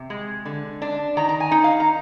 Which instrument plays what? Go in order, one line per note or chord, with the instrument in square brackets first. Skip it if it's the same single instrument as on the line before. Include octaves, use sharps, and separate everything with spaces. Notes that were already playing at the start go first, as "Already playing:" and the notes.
Already playing: [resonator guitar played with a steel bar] C3
G#3
D3
D4
D#3 A#5
A#5
G#5
D#4
F5
A#5